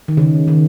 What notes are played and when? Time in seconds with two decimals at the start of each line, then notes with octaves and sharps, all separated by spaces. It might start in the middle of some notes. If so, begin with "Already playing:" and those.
0.08 D#3
0.17 C#3
0.48 D#3